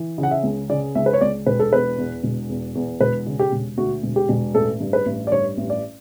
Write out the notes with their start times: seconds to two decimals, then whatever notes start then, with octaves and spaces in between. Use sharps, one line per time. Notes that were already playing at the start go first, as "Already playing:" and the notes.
Already playing: E3
0.18 C#3
0.23 F#5
0.31 E5
0.43 C#2
0.70 C#3 D5
0.95 C#2 E5
1.06 B4
1.13 C#5
1.21 C#2 D5
1.46 E1 B4
1.59 A4
1.72 E2 B4
1.98 E2
2.24 E1
2.49 E2
2.75 E2
3.00 E1 B4
3.26 C#3
3.39 G4
3.52 E1
3.77 D2 F#4
4.03 E1
4.16 G4
4.29 E1
4.55 A1 A4
4.80 G2
4.93 B4
5.06 A1
5.27 D5
5.32 G2 C#5
5.57 A1
5.70 D5